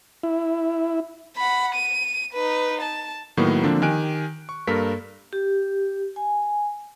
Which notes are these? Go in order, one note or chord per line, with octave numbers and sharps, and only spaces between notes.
E4
F#5 B5
D#7
D#4 B4
A5
A2 D#3 F#3 A#3 B3
D3 F3 A#3 C4 D4
D#3 G4 G#5 F#6 D7
C#6
G2 A#3 A4 A#4 B6
G4
G#5